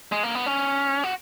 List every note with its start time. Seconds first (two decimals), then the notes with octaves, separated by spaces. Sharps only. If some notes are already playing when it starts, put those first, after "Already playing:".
0.12 G#3
0.23 A#3
0.35 B3
0.46 C#4
1.04 F#4